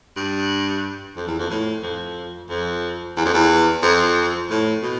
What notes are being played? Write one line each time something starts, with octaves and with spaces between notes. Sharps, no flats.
G2
F2
E2
F2
A2
F2
F2
E2
F2
E2
F2
A2
B2